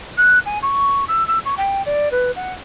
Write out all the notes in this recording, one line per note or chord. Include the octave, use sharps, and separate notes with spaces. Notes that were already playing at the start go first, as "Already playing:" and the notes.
F#6
G#5
C#6
E6
E6
C#6
G5
D5
B4
F#5